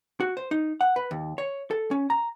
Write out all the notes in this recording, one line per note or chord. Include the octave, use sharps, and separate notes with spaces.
F#4
C5
D#4
F#5
B4
D#2
C#5
A4
C#4
A#5